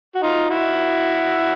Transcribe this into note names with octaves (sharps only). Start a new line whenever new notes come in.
F#4
D#4 F4
E4 F#4